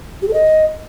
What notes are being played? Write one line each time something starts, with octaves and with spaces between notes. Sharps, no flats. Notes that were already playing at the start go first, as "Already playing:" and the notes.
G4
A4
D#5